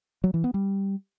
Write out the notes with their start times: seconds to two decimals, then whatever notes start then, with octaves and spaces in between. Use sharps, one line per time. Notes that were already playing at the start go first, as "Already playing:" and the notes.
0.24 F#3
0.34 E3
0.44 B3
0.54 G3